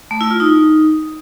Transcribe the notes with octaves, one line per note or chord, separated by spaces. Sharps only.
A3
E4
F4
D#4